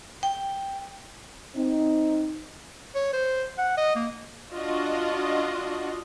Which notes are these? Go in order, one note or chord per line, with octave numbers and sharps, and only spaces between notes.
G5
C4 D#4
C#5
C5
F#5
D#5
A#3
D4 F4 F#4 D#5